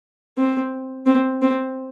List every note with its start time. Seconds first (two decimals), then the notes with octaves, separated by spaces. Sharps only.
0.38 C4
1.06 C4
1.42 C4